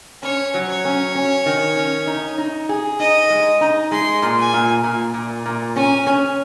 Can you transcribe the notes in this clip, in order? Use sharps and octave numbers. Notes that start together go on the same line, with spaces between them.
C#4 C#5
F#3
C#5
C#4
C#4
D#3
C#4
D#4
D#4
G#4
D#4 D#5
G#3
D#4
G#3 C6
A#2
G#5
A#2
A#2
A#2
A#2
C#4 G#5
C#4